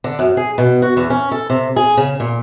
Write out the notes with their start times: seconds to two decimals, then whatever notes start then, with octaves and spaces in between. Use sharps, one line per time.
0.04 D3
0.19 F#2
0.37 G#4
0.58 B2
0.82 F#4
0.97 E2
1.10 C#4
1.31 A4
1.50 C3
1.76 G#4
1.97 C#3
2.20 A#2